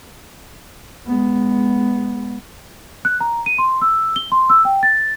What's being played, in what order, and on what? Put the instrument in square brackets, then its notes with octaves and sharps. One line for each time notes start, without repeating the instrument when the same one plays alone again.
[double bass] G#3 B3
[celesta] F#6
A#5
D#7
C6
E6
G7
C6
E6
G5
A6